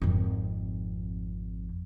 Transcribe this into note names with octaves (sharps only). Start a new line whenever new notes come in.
G#1 F2